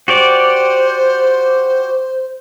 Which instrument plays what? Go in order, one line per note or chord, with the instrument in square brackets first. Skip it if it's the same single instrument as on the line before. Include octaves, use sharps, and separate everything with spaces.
[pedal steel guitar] F#4 G4 D5 [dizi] C5